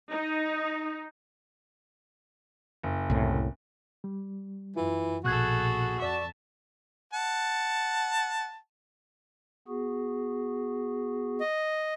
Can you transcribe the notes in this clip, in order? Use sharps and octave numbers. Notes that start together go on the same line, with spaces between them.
D#4
F#1
C2 A2
G3
F#2 E3 F4
A#1 B2 F#4 G#4 A4 F#6 G#6
F2 D5 E5 A5 C#6
F#5 A5
B3 F#4 G#4
D#5